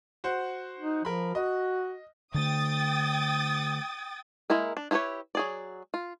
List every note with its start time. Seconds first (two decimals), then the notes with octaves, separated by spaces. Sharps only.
0.24 F#4 C5 F#5
0.80 D#4
1.05 F3 A#4 B5
1.35 F#4 D#5
2.34 D3 A3 G5 D#6 A6
4.50 G#3 A#3 E4 A#4
4.77 D4
4.91 E4 F4 G4 B4 C#5
5.35 F#3 G#4 D5
5.94 F4